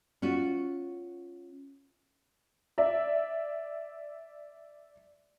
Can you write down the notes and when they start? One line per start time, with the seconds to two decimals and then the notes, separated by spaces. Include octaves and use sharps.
0.22 C#4 F4 F#4
2.78 D5 E5